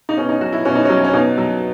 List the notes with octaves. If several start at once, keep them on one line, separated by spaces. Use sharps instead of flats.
D#4
B2 C#4
D#4
F#3 F#4
E4
B2 C#4
D#4
F#3 C#4
C#4
B2 D#4
F#3